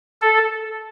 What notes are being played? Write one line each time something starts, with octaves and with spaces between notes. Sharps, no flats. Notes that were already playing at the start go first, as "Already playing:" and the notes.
A4